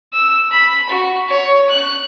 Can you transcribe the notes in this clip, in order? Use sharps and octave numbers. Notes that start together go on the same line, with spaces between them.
E6
B5
F#4
C#5
F#6